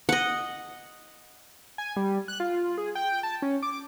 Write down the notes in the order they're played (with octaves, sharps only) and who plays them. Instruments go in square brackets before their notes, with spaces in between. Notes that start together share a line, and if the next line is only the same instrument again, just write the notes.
[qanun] D#5 F#5
[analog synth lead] G#5
G3
F#6
F4
G#4
G5
A5
C#4
D6